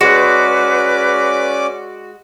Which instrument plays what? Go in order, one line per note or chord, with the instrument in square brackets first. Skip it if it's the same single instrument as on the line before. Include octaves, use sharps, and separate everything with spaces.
[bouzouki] G#3 [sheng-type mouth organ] C#4 D5 D6 [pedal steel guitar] F#4 [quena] B4